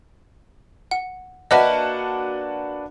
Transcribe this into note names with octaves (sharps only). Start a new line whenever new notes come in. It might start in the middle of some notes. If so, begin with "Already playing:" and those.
F#5
A#3 D4 F#4 B4 D#5 E5 F#5 A5